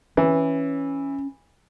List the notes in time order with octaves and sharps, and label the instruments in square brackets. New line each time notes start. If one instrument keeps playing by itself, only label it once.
[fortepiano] E3 [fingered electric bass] C#4